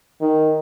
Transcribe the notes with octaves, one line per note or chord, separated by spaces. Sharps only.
D#3